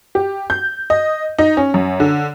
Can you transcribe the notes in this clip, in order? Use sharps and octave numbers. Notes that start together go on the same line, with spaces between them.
G4
G6
D#5
D#4
C#4
F#2
D3